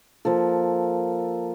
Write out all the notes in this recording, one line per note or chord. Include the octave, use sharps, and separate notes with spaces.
F3 A#3 A4